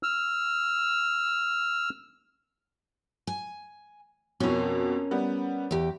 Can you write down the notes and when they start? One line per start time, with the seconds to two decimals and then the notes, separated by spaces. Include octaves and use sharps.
0.03 E6 F6
3.27 G#5
4.40 F2 B2 C#4 A#4
5.11 G3 B3
5.71 E2 G4